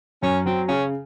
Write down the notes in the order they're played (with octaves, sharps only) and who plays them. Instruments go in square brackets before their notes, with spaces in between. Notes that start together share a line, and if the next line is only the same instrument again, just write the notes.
[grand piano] F#2 [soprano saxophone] C#4
[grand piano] F#3 [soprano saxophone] C4
[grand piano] C#3 [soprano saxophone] C#4